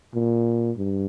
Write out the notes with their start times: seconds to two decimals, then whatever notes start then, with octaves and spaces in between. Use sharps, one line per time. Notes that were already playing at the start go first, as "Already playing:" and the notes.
0.15 A#2
0.77 G2